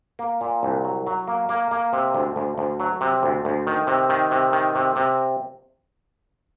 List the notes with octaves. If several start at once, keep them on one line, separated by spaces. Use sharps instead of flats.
A#3
A#2
C2
F#3
F#3
A#3
A#3
A#3
C3
D2
D2
D2
F#3
C3
D2
D2
D#3
C3
D#3
C3
D#3
C3
C3